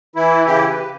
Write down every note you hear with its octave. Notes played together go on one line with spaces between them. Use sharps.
E3 E4
C#3 E4 G4
G4 B4
C#3